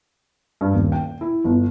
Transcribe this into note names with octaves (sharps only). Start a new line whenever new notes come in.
G2
D#1
G5
E4
G1